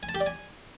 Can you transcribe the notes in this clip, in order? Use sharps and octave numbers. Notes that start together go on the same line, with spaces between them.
G#5
A5
G4
D5
G#5